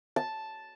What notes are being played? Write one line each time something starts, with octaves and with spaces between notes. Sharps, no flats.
A5